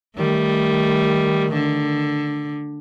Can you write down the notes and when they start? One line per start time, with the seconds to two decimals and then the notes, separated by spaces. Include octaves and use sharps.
0.17 D#3 G3 A3
1.53 D3